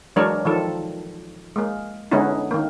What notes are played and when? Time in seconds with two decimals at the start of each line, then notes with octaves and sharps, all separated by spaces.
0.16 E3 F#3 G#3 D4 A#4 C#5
0.45 D#3 F3 A4
1.56 G#3 A#3
2.11 D3 G#3 B3 C#4 D#4 E4
2.51 D#3 A#3